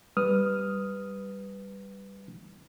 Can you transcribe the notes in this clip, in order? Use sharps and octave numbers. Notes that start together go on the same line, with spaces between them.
G3 B4 D#6 F6